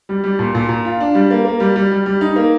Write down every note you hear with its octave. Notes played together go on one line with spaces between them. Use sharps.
G3
G3
A#2
A#2
A#2
F4
D4
G3
A#3
A#3
G3
G3
G3
G3
D#4
A#3